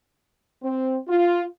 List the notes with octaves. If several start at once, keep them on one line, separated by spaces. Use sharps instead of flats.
C4
F4